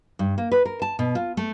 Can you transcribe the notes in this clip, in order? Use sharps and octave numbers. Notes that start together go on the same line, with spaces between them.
G2
A#3
B4
A#4
A5
B2
F4
A3